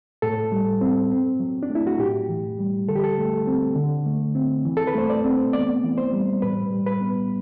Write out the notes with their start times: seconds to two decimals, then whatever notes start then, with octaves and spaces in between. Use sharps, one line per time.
0.22 A2 A4
0.52 G3
0.81 C4
1.11 C4
1.40 F#3
1.63 D4
1.70 A3
1.75 E4
1.87 F#4
1.99 A2 G4
2.29 E3
2.59 G3
2.88 D3 A4
2.96 G4
3.04 A4
3.18 A3
3.47 C4
3.76 D3
4.06 A3
4.35 C4
4.65 E3
4.77 A4
4.87 B4
4.95 A3 C5
5.10 D5
5.24 C4
5.53 B3 D5
5.84 E3
5.98 C5
6.13 G3
6.42 A2 B4
6.71 G3
6.86 B4
7.01 B3